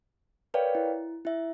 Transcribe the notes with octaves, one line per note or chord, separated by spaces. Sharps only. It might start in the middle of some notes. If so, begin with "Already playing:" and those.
A#4 B4 C#5 D5 F5 G5
E4
E4 E5